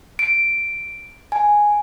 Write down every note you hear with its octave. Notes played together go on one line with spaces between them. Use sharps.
D7
G#5